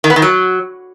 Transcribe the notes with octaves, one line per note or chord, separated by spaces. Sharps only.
D#3
B3
D#3
F#3